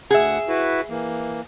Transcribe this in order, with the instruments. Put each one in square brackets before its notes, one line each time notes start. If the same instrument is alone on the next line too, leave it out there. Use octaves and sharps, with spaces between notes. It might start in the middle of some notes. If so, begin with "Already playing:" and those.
[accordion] D2 F#5 [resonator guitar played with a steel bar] G#4 E5
[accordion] E4 F#4 B4
E3 A#3